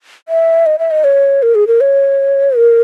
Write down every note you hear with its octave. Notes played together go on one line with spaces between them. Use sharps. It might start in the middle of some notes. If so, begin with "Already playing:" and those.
E5
D#5
E5
D#5
C#5
A#4
G#4
A#4
C#5
A#4